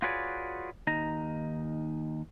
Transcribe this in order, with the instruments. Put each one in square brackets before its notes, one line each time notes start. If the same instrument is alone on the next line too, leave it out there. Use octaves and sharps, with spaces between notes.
[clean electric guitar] F4 F#4 G#4 B4 C#5 D5
D#2 D#4 A#5